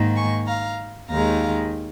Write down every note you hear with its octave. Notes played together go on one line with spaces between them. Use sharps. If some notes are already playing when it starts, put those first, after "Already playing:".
Already playing: G#2 D#3 A#3
G#5 C#6
F5 A#5
D#2 D#3 G#3 F5 A#5